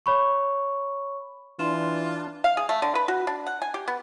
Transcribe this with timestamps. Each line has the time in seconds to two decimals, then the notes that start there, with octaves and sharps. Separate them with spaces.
0.06 C#5 B5 C#6
1.59 E3 D4 F4 C6 E7
2.44 F5
2.57 G#4
2.69 A3
2.82 D3
2.95 B4
3.08 F#4
3.27 D4
3.47 F#5
3.62 G#5
3.74 G4
3.88 B3